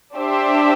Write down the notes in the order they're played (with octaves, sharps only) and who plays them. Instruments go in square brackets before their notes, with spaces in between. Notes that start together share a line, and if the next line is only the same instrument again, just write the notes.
[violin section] D4 G4 C5 E5